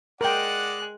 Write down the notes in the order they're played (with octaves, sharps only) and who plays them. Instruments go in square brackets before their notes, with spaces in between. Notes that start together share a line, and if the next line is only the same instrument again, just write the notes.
[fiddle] G#3 F#6 [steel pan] A#4 G5 [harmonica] D5 D#5 F#5